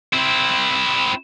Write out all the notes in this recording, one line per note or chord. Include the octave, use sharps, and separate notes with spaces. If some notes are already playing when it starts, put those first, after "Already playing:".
C4 E4